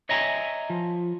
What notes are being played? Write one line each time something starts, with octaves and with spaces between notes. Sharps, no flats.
C#5 D#5 E5 G5 G#5 A#5
F3